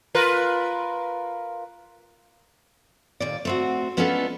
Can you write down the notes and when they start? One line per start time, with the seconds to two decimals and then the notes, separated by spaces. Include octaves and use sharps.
0.15 F4 A#4 B4
3.20 D#2 A#2 D5
3.45 A3 C4 F#4
3.97 G#3 B3 C#4 D4 F4 A4